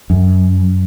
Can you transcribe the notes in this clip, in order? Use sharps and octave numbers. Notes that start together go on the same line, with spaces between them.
F#2